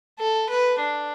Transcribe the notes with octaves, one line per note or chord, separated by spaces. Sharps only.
A4
B4
D4